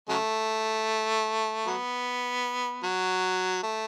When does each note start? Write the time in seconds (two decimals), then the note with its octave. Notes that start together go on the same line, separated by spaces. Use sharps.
0.09 C#3 F#3 A3
1.67 F#3 B3
2.84 F#3
3.63 A3